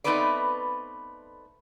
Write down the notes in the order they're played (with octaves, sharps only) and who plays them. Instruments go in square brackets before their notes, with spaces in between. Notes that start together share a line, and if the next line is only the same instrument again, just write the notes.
[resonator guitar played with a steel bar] A3 B3 C4 D#4 B4 D5